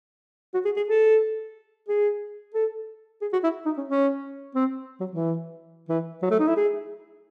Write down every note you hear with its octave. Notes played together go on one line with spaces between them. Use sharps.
F#4
G#4
G#4
A4
G#4
A4
G#4
F#4
E4
D#4
C#4
C#4
C4
F#3
E3
E3
F#3
A3
D#4
E4
G#4